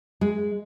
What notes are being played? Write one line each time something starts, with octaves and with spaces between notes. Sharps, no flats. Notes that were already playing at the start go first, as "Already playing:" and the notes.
G#3